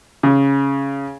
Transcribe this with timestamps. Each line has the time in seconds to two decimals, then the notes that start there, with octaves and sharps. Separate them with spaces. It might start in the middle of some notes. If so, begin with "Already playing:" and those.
0.23 C#3